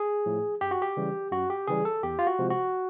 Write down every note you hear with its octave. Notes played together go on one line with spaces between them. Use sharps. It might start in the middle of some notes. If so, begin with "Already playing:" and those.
Already playing: G#4
A2 F3
F#2 G4
F#4
G4
C#3 E3 G3
F#2 F#4
G4
C#3 E3 G3 G#4
A4
E2 G4
F4
F#4
C3 F3 G#3
F#4